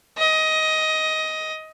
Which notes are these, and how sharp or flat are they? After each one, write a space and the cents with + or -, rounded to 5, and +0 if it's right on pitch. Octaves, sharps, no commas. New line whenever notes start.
D#5 +15